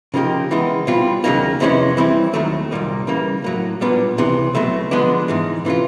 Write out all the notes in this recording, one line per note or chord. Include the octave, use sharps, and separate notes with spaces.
C#3 F3 A#3 D#4 G4
C#3 E3 G#3 B3
B2 G3 C4 F4
D#2 C#3 F#3 A#3 D#4
F2 C3 E3 G#3 C#4
E3 G3 C4 E4
D#2 D#3 F#3 A3
C2 A#2 G3 A#3 D#4
C#3 E3 G3 A#3
A2 F#3 A#3
A#2 G3 B3 D4
C#2 C3 E3
C#2 B2 F#3 A3
D3 F3 G#3 B3 D4
G#2 E3 G#3
C3 E3 A3 C#4 F4